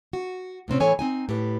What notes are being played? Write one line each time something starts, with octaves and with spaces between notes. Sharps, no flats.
F#4
A2 C3 C4 C#4
A2 E3 B3 A4 C#5 G#5
C4 D#4 G#5
A2 G4 B4